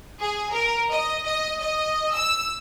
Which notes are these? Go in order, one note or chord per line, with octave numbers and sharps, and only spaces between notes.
G#4
A#4
D#5
D#5
D#5
E6